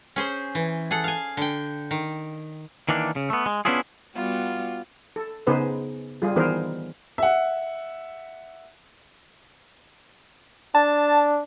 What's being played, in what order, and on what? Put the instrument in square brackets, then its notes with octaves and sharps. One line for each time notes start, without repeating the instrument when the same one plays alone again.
[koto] C#4 G#4 C5
E3
G#4 A4 F#5
F5 G#5
D3 G5
D#3
[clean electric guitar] D#3 E3 A#3 D4
C#3
A3 B3
G#3
B3 C#4 D4 E4 F4 G#4
[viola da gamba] G3 B3 F#4 [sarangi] F4
[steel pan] A4
C#3 B3 D#4 G#4 B4 C5
G3 F4 G#4
D#3 E3 B3 G#4 A#4 C5
[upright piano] E5 F#5
[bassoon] D4 [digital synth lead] A5